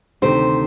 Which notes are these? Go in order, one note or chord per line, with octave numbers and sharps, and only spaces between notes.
D2 C3 D#3 C5